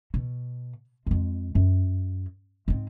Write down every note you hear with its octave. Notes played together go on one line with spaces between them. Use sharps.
B2
F2 G#3
F#2
G#2 C4